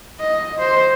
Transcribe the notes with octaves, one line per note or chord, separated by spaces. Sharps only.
D#5
C5